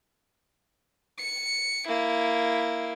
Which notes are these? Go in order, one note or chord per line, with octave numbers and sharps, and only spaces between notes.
C#7
A#3 E4